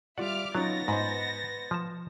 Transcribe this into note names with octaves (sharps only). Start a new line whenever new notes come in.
G3 F4 D5 E5 F#5 D6 F6
F#3 B3 C#4 D#4 F4 A6 A#6
G#2 C5 D#5 B5
F3 A5